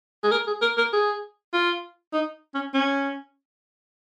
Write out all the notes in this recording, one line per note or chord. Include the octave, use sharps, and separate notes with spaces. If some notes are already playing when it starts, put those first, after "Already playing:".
G#4
A#4
G#4
A#4
A#4
G#4
F4
D#4
C#4
C#4